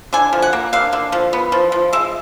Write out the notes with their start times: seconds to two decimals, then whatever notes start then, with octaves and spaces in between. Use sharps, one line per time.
0.13 D3 G#5
0.33 F3
0.42 F#5
0.53 A#3
0.73 D3 F5
0.93 D3
1.12 F3
1.33 B3
1.52 F3
1.72 F3
1.93 G#3 E5